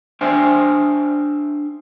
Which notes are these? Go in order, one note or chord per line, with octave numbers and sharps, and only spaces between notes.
D4 C5 E5 G5 G#5